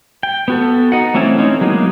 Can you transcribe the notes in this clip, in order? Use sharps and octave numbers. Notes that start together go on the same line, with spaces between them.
G5
B3 F#4 A4
D#4 F#5
E3 A3 C4 C#4 E4
E3 C4 C#4 D#4
F#3 G#3 A#3 B3 D#4